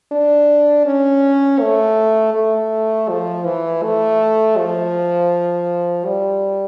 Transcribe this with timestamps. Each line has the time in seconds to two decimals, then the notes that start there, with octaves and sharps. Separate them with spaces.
0.12 D4
0.86 C#4
1.61 A3
2.34 A3
3.09 F3
3.46 E3
3.83 A3
4.58 F3
6.05 G3